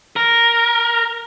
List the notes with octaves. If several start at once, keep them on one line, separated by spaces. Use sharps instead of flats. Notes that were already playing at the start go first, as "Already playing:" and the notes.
A#4